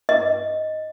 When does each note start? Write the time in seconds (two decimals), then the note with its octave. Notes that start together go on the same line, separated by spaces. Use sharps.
0.09 D#5